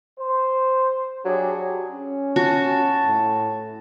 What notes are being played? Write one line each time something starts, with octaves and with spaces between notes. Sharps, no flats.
C5
F#3 D4 G4 G#4
C#4
F#4 A5
A2